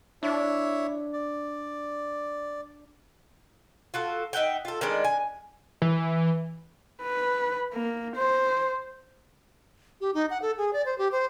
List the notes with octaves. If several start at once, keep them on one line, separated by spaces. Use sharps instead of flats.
D4 E4 C#5 E5
D5
F4 F#4 A4
D#4 E5 F#5 G5
F4 A4
D#3 G3 G#3 D4
G#5
E3
B4
A#3
C5
G4
D#4
F#5
A4
G#4
D5
C5
G4
C5